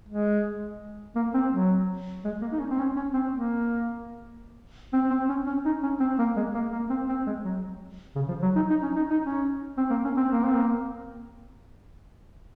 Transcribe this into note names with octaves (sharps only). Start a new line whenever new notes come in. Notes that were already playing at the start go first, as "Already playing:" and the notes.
G#3
A#3
C4
F#3
G#3
A#3
D#4
C#4
C4
C#4
C#4
C4
A#3
C4
C4
C#4
C#4
D#4
C#4
C4
A#3
G#3
A#3
A#3
C4
C4
G#3
F#3
C#3
F3
F#3
D#4
D#4
C#4
D#4
D#4
C#4
C4
A#3
C#4
C4
A#3
C4
A#3